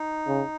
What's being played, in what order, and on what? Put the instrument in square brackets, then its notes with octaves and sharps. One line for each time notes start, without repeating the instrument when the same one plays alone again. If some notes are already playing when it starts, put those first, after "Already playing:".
Already playing: [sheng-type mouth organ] D#4
[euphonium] C#3